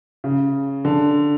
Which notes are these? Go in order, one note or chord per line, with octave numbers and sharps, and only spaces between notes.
C#3
D3